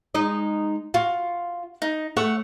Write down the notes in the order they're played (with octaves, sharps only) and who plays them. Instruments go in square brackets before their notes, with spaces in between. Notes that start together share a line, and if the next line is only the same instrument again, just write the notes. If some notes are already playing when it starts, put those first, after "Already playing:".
[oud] G#3 D#4 D#5
[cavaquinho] F4 [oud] F#4
[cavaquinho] D#4
[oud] A3 [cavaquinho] C#5 E5 F#5